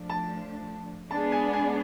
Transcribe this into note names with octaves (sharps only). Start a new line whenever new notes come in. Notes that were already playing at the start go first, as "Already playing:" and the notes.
Already playing: F3 A3 D4
A5
G#3 B3 D4 G#4 A5
G#5
G#5